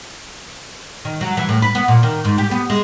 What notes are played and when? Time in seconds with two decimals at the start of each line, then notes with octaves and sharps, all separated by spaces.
1.05 D#3
1.21 F#3
1.37 E3
1.49 A2
1.62 B4
1.75 B3
1.88 A#2
2.03 D#3
2.25 G#2
2.38 G4
2.51 B3
2.70 G#3